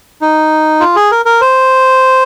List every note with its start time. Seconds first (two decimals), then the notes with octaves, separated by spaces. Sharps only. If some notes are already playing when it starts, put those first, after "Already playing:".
0.21 D#4
0.80 F4
0.96 G#4
1.11 A#4
1.26 A#4
1.41 C5